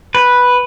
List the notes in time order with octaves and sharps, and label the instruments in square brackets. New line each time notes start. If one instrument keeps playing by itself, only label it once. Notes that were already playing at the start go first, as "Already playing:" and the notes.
[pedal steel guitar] B4